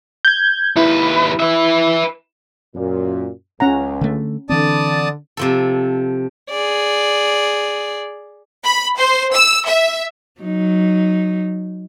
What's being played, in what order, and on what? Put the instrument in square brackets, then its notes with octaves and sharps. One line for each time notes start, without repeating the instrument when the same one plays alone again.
[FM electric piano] G6 G#6
[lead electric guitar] D#2 B4 [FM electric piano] E4
[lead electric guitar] B4 E5
[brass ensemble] F#2 A#2
[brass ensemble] C#2 [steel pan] C#4 F#5 A#5
[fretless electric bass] D3 A3
[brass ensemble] D3 [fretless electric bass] E3 C4 [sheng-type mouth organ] D5 A5 D#6
[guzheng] C3 F3 A4
[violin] G#4 D5
[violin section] B5
C5
E6
E5
[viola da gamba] F#3 D#4